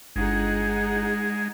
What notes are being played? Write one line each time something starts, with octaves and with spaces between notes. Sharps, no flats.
G1 G#3 D#4 G#4 F#5